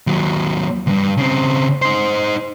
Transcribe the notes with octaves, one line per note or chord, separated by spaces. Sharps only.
D#2 F#3
D2 G2
C#3 C4
D#4 C5